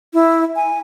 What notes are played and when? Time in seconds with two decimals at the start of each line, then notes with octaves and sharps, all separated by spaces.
0.14 E4
0.56 G#5